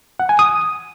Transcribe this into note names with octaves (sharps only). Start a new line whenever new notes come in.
F#5
G#5
D#6